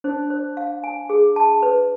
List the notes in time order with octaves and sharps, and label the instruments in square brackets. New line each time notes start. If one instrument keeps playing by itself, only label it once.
[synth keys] D4 [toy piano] C5
[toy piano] C5
F5
G#5
G#4
A5
B4